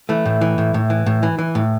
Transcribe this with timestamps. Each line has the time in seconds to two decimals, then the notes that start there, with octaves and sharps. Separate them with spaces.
0.09 E3 A3
0.26 A2
0.41 E3
0.58 A2
0.74 A2
0.90 E3
1.06 A2
1.23 E3
1.39 E3
1.55 A2